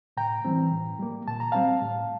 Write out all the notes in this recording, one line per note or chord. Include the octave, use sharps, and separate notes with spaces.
A2 G5 A#5
E3 G3 C4
A2
G3 A#3
A#2 A5
A#5
G3 C4 F5 A5
A2